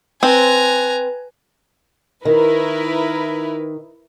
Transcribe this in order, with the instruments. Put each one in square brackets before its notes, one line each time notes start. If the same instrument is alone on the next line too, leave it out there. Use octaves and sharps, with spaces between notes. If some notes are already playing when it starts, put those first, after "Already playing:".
[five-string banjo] C4 [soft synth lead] B4 [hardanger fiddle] G#5 A#5
[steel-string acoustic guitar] D#3 [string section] E4 A#4 B4